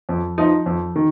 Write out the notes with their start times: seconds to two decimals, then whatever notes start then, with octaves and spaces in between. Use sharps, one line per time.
0.09 F2
0.38 F3 D#4
0.66 F2
0.96 D#3